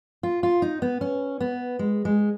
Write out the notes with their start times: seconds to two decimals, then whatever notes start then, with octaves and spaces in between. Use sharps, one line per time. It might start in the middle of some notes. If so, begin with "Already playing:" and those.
0.23 F4
0.43 F4
0.62 D#4
0.82 B3
1.01 C#4
1.40 B3
1.79 G#3
2.05 G#3